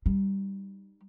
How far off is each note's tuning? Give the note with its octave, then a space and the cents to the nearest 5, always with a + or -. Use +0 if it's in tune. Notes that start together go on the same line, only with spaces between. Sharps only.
G3 +0 D#4 -25